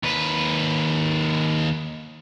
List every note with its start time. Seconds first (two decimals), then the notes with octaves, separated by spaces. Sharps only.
0.03 D#2 B4